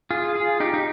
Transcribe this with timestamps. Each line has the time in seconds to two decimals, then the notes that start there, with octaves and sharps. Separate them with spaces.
0.11 F4 G#4
0.35 F4 G#4
0.60 D#4 G4
0.74 D#4